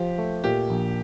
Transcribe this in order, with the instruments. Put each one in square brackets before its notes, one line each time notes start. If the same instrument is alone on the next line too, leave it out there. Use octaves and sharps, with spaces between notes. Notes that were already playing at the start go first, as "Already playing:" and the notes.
Already playing: [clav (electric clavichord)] F3 [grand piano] G4
[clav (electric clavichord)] A3
[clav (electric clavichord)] A#2 [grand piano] G4
[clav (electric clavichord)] A#1